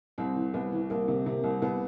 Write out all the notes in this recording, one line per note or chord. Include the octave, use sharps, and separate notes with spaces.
C2 C4
E3
C2 B3
E3
C2 A#3
C3
C3 A#3
C2
C2 B3